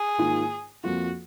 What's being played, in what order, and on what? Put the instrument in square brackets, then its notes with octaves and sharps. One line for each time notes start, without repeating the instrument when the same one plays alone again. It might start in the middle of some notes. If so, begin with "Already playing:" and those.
Already playing: [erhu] G#4
[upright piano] G#2 D#3 A#3 F4
[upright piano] F2 F3 A#3 F4 [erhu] F#4